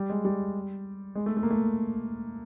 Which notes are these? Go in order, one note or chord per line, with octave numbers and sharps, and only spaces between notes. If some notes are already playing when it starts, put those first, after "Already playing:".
Already playing: G3
G#3
G3
G#3
A3
A3
A#3
A3